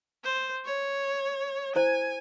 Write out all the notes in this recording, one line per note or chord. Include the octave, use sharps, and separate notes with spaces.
C5
C#5
E4 C5 G#5